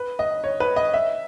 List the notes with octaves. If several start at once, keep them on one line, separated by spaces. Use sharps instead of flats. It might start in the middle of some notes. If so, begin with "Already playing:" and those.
Already playing: B4
D#5
C#5
B4
D#5
E5